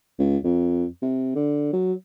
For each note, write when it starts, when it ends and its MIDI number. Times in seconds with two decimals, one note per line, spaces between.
0.19 0.37 37
0.44 0.86 41
1.02 1.33 48
1.35 1.69 50
1.73 1.93 54